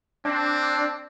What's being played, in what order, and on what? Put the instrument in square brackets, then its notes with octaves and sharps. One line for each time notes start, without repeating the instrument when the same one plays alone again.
[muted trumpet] C4 [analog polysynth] D4